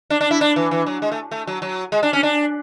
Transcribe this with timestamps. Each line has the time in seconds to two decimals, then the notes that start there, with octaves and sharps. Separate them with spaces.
0.10 D4
0.21 D4
0.31 E4
0.41 D4
0.56 E3
0.71 E3
0.86 F#3
1.02 G#3
1.12 A3
1.31 A3
1.47 F#3
1.62 F#3
1.92 G#3
2.03 D4
2.13 C#4
2.23 D4